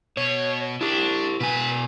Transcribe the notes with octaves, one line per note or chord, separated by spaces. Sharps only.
B2 C#5
D4 E4 G4
B2 B4 G#5